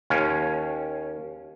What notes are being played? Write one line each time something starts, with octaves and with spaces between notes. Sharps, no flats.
D#2 C#4